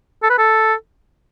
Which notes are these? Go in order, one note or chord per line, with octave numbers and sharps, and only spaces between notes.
A4
B4
A4